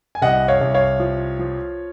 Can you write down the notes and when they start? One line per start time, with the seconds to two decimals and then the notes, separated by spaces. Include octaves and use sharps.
0.15 G#5
0.22 C2 D#5 F#5
0.48 C#5 F5
0.61 C2
0.74 C#5 F5
1.00 F3
1.39 F3